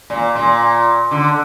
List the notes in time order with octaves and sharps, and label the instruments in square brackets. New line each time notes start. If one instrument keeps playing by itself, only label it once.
[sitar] A#2
A#2
D3